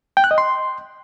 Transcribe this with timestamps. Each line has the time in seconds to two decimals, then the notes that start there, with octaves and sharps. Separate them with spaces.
0.17 G5
0.24 F#6
0.31 D#5
0.38 C6